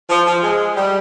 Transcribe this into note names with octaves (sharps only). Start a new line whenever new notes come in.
F3
F3
G#3
G3